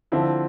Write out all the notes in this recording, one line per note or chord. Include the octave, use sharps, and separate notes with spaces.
D3 F3 C4 E4